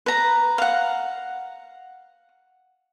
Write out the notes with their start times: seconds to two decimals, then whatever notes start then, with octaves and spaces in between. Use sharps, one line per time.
0.06 B4 A#5
0.58 F5 F#5